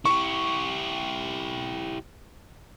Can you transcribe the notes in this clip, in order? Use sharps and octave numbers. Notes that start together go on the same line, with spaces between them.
E4 G4 C#6